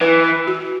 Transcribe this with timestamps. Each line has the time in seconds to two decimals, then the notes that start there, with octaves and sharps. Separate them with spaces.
0.01 E3 B4
0.24 B4
0.47 F#4